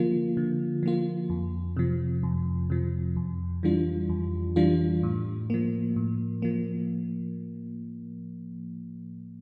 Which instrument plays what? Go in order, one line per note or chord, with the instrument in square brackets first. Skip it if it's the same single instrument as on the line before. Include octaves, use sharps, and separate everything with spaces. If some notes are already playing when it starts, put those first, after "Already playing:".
Already playing: [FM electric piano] D3 F3 A#3 F4
D3
F3 A#3 F4
F2
C3 F3
F2
C3 F3
F2
E3 G3 D4 F4
F2
E3 G3 D4 F4
A2
F3 A#3
A2
F3 A#3